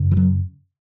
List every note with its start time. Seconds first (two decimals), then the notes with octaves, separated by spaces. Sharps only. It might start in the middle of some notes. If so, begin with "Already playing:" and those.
Already playing: F#2 C#3
0.11 E3
0.17 F#3